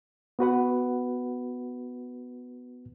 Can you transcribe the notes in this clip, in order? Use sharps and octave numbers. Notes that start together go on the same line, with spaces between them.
B3 F#4 B4 F#5